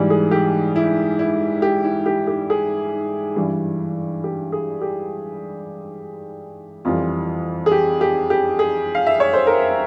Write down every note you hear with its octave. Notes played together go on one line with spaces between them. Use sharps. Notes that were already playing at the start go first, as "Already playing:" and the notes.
Already playing: G#2 E3 G3
G#4
G4
E4
E4
G4
E4
G4
G4
G#4
G2 E3 G3
G4
G#4
G4
F2 E3 G3 F4
G#4
G4
G4
G4
G#4
F5
E5
C#5
C5
A#4